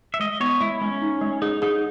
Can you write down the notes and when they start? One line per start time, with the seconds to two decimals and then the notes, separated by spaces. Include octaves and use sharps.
0.14 E5
0.20 G#3 D#5
0.40 B3 C#5
0.60 G#3 E4
0.81 G#3 C#4
1.02 D#4
1.21 G#3
1.42 D#4 G#4
1.62 D#4 G#4